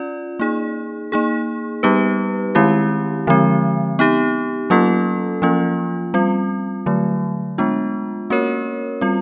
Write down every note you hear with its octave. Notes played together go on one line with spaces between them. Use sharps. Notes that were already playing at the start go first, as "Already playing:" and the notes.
Already playing: C#4 F4 D5
A#3 D#4 G#4
A#3 D#4 G#4
G3 B3 D#4 G4 B4
D#3 G#3 C4 E4 G4
D3 F3 G#3 C4
B3 D#4 G4
F#3 A#3 C#4 F4 A4
F3 A#3 C#4 F4
G3 C4 F4
D3 F#3 A3
G#3 B3 D4 F4
A#3 C#4 F#4 A#4 C#5
G3 C4 F4